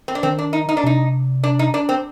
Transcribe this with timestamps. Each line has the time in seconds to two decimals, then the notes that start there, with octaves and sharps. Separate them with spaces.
0.08 C4
0.15 D4
0.23 D#3 C4
0.38 D4
0.53 D#4
0.69 D#4
0.77 D4
0.84 C3 D#4
1.44 D4
1.59 D#4
1.74 D4
1.89 C4